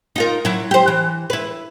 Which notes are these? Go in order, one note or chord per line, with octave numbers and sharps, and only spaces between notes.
D#4 F4 A#4
F#3 E4
G4 C5
E3
E4 B4